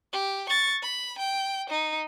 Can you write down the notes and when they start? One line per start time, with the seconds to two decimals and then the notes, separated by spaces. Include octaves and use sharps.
0.13 G4
0.49 C#6 A6
0.83 B5
1.18 G5
1.70 D#4